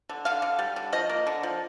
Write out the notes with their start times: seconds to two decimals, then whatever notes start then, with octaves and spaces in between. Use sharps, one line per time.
0.09 D3
0.25 D3 F5
0.42 D3
0.59 G3
0.76 D3
0.93 F3 D#5
1.09 A#3
1.27 D3
1.43 F3